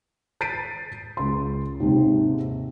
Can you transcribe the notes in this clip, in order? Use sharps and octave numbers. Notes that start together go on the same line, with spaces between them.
G6 A6 B6 C7 D7 D#7
C#2 C6
D#2 G#2 C3